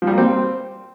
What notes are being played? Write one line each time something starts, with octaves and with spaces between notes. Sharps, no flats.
F3
G3
A#3
C4